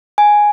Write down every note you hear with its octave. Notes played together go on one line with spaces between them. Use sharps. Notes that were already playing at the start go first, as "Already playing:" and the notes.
G#5